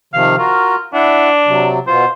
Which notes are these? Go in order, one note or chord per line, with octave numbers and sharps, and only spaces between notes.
C3 D#3 F3 F5
F4 F#4 A#4
D4 E4 E5 F#5
C3 F#3
B2 F4 C5